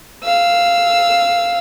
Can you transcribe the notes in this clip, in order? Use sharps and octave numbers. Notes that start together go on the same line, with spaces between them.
F5 E6